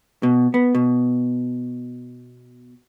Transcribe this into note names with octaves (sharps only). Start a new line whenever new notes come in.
B2
B3
B2